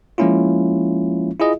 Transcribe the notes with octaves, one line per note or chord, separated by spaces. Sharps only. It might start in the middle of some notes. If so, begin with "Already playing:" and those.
F3 G#3 A#3 C#4 E4 F4
E4 F4 G#4 D#5 E5